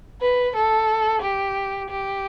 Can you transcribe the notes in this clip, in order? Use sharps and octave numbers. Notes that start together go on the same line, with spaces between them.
B4
A4
G4
G4